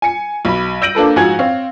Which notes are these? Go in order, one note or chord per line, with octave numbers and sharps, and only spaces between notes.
G#5 C#7
B1 B5
E6 G6 A#6 D7 D#7 F#7
A#3 D4 A4 B4
G#2 F3 F#4 G#5 G#6
C4 C#5 F5